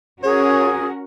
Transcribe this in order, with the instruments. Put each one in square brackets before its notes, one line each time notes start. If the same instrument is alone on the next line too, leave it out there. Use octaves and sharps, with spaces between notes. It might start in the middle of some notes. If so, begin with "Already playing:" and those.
[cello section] C#4 F#4 A#4 [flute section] G#4 [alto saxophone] C#5